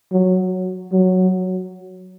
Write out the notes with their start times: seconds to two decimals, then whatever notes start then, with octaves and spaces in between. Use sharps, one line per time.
0.12 F#3
0.92 F#3